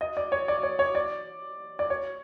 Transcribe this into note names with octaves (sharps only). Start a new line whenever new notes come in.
D#5
D5
C#5
D5
C#5
C#5
D5
D5
C#5